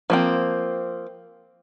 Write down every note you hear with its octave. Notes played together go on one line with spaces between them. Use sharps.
F3 A#3 C4